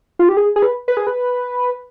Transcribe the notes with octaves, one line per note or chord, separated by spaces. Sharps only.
F4
G4
G#4
G#4
B4
B4
G#4
B4